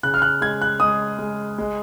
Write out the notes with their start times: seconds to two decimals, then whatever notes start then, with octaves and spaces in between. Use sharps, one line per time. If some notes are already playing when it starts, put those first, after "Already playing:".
0.03 C#3 F#6
0.14 F6
0.22 F#6
0.41 G#3 G#6
0.62 F#6
0.80 G#3 D#6
1.19 G#3
1.58 G#3